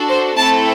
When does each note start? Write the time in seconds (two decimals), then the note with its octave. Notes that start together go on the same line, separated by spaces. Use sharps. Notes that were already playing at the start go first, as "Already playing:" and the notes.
Already playing: D4 F#4 A4
0.09 C5
0.38 A3 C4 E4 A4 A5